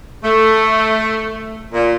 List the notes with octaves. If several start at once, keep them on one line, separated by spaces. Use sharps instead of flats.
A3
A#2